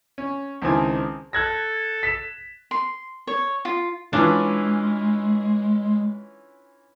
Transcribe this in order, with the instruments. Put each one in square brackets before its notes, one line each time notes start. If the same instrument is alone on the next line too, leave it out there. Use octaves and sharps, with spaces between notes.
[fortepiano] C#4
C#2 D#3 C4 E4 G#5 A5
[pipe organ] A4 [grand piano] F#6 G#6 A#6
[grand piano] B6 E7
[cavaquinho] C6
C#5
F4
[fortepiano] E3 C#4 F4 [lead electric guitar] G#3 [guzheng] D4